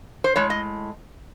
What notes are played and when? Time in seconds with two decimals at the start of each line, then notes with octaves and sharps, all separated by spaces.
0.24 C5
0.36 A2 G#3 C#5
0.50 D#5